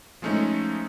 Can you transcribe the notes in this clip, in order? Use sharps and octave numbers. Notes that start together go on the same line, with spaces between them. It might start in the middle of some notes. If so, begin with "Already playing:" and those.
F3 G#3 A3 C#4 D#4